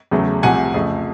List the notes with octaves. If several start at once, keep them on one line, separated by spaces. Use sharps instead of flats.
E2 C#3 F#3 A3
C2 C3 F3 A3 F#5 G#5
F2 C#3 F3 A3